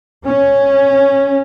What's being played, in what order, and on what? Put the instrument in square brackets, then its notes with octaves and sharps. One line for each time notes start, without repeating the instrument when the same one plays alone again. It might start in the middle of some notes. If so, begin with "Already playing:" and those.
[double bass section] C#4